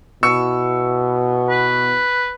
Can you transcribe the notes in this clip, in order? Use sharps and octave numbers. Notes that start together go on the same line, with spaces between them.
B2 B3 E4 F#4 C#6 E6 C#7
B4